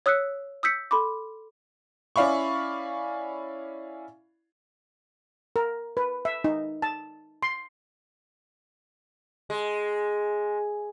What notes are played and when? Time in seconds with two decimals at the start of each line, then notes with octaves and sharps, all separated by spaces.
0.06 C#5 D#6 E6 F#6 B6 C#7
0.63 D#6 E6 G6 B6 C#7
0.91 A4 B5 C6 D6
2.16 C#4 E4 D5 F5 B5 C#6
5.56 A#4
5.97 B4
6.25 E5
6.44 D#4
6.82 A5
7.43 C6
9.50 G#3